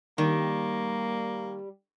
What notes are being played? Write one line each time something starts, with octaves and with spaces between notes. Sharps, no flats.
D#3 G3 A#3